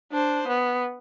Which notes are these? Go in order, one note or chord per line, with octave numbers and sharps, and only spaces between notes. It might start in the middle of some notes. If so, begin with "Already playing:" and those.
D4 C5
B3